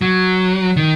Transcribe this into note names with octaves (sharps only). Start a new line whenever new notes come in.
F#3
D#3